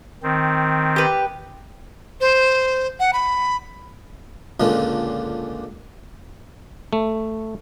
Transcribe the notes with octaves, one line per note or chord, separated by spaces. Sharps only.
D#3 C4
G4 B4
C5
F#5
B5
C#2 A#2 D3 C#4
A3